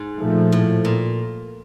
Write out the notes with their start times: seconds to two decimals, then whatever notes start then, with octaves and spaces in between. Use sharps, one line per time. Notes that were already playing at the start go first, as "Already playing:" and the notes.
Already playing: G#2
0.19 A#2 F3 A3
0.52 A2
0.85 A#2